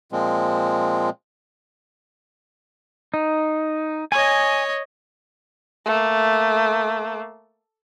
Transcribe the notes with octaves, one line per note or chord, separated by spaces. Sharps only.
A#2 F3 G#3 C4
D#4
C#5 D#5 G#5
A3 A#3